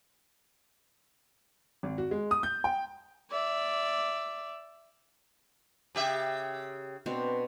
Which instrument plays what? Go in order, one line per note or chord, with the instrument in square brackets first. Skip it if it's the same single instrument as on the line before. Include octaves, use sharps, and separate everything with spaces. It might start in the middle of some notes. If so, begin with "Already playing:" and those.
[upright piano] G#1
F#4
G#3
D#6
G6
G5
[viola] D5 E5
[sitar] C#3 G4 E5
[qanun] B2 C4 D4